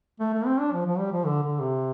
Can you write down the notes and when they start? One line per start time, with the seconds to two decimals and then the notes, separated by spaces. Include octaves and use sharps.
0.20 A3
0.34 A3
0.46 C4
0.59 D4
0.73 F3
0.86 F3
0.98 G3
1.12 F3
1.25 D3
1.44 D3
1.60 C3